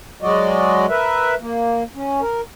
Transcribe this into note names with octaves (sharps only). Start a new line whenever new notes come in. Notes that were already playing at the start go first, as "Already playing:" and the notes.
F#3 G#3 F#4 D5 D#5
A#4 B4 E5
A#3
C#4
A#4